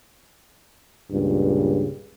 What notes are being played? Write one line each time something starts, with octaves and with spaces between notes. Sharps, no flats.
C#2 G2 A#2 C#3